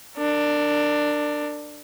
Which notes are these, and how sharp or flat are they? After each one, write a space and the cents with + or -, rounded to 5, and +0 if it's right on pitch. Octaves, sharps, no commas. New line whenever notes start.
D4 +10 A#4 -25